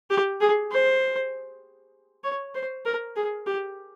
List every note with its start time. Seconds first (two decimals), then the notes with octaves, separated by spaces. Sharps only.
0.10 G4
0.41 G#4
0.71 C5
2.23 C#5
2.54 C5
2.85 A#4
3.16 G#4
3.46 G4